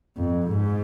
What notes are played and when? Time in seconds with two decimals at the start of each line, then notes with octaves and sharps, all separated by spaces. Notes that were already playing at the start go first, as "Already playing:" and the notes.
0.17 F2
0.49 G#2